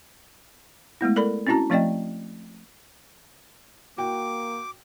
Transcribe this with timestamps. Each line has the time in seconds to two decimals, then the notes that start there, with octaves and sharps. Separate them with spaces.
1.01 G#3 A3 B3 E4
1.16 A4 A#4 D5 B5
1.47 C4 C#4 E4 F#4 A5 A#5
1.70 F3 A3 C4 D5 D#5 G5
3.98 A#3 F#4 G5 D6